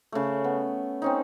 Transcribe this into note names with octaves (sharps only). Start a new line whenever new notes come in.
C#3 A3
B3
C4 C#4 D#4